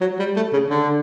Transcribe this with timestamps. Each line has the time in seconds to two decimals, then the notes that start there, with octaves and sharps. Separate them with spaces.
0.01 F#3
0.19 G3
0.36 A3
0.53 C#3
0.70 D3